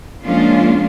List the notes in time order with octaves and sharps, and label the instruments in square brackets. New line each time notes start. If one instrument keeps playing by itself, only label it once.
[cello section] F3 G#3 A#3 C#4 D4 F4